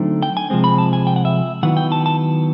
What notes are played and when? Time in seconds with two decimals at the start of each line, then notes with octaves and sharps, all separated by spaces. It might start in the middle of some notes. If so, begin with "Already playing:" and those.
Already playing: D3 F#3 A3 C4 D#4
0.23 G5
0.37 G#5
0.50 C3 F3 G#3 C4
0.64 B5
0.78 A5
0.93 G#5
1.07 G5
1.16 F#5
1.25 E5
1.63 D#3 F#3 B3 E4 F#5
1.77 G5
1.92 A5
2.06 A5